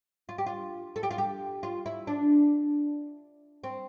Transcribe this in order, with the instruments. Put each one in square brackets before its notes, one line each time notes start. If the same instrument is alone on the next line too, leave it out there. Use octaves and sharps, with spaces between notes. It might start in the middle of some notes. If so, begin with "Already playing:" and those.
[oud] F4
G4
F4
A4
G4
F4
G4
F4
E4
D4
C4